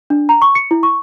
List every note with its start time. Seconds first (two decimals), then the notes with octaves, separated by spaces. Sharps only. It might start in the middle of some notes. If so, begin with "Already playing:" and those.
0.10 D4
0.29 A#5
0.42 C#6
0.55 C#7
0.71 E4
0.83 C#6